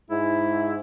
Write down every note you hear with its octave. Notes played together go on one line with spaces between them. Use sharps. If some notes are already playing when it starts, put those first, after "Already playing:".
G#2 E4